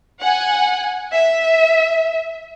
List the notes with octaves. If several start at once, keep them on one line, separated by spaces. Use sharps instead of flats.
F#5 G#5
E5